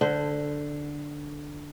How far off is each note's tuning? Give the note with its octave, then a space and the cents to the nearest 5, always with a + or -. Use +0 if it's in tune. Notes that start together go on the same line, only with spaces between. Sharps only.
D3 +0 C5 -20